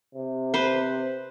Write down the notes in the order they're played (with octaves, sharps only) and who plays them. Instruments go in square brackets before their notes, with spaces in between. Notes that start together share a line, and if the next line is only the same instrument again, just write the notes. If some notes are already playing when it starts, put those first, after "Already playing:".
[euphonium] C3
[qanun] B4 C5